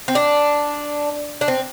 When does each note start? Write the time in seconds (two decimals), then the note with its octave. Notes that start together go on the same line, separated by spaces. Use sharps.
0.08 C4
0.15 D4
1.41 D4
1.48 C4